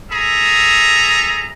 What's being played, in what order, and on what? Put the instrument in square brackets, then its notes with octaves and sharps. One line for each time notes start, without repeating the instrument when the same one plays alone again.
[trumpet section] G#4 A4 E5 A#5